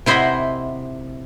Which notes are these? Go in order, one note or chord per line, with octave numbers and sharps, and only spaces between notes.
C3 E4 C5 D#5 F#5 B5